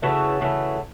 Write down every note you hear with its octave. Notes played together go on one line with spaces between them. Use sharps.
C#3 E3 A3 F#4 A4
C#3 E3 A3